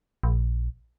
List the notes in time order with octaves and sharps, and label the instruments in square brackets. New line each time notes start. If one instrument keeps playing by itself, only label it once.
[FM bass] A#1